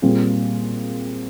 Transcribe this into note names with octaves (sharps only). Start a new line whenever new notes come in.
A#2 G3 C4 F4 G#4